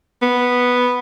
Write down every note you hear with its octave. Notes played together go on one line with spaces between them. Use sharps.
B3